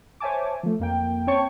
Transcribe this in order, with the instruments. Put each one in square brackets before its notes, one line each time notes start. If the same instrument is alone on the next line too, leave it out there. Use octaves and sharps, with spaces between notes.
[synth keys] C5 C#5 E5 G#5 A5 D6
F3 A3
F2 A#3 G5
C4 C#5 G5 A5 C#6